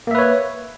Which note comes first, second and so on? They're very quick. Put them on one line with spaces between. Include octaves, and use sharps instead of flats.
A#3 E5 B4 C#5